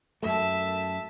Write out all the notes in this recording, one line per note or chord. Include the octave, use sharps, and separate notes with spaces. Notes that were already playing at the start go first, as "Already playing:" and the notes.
F#2 A3 E5 A5